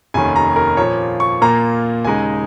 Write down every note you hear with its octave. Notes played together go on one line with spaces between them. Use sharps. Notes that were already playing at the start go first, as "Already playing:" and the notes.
F1 D#2 D#3 C#4 G#5
A#5
A#4
A#2 F3 A#3 C#5
C#6
A#2 A#3 F4 A#5
D#2 C#3 G#3 D#4 G#5